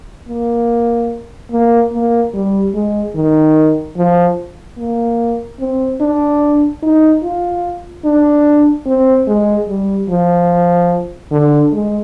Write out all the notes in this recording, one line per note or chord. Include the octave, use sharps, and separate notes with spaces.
A#3
A#3
A#3
G3
G#3
D#3
F3
A#3
C4
D4
D#4
F4
D4
C4
G#3
G3
F3
D3
G#3